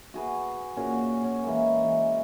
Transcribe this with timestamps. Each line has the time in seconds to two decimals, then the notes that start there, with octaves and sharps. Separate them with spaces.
0.14 F#4 G#4 B4
0.77 A#2 C#4 F#4 G#4
0.96 F#4
1.24 C#4
1.44 E3 G#3 A#3
1.84 E3